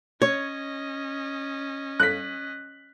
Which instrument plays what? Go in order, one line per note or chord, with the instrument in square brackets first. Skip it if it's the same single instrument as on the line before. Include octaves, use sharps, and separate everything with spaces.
[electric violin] C#4 D#5 [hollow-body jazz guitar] C#5
[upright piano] F#6 B6